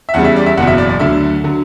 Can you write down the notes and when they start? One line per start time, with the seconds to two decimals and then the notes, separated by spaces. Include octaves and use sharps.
0.09 E5
0.14 E2 C#3 G3 F#5
0.24 E5
0.36 D5
0.46 E5
0.57 F#1 E2 B2 F#3 F#5
0.67 E5
0.78 D5
0.89 D5
0.99 D2 D3 F#3 E5
1.44 D3 F#3